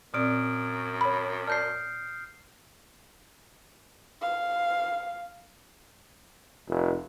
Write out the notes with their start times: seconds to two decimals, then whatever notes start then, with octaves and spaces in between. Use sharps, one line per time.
0.14 F#2 A#2 C4 D5 D#6 F6 D7
1.01 C#5 B5
1.47 D5 A5 F6 G6 C7
4.22 F5
6.68 F1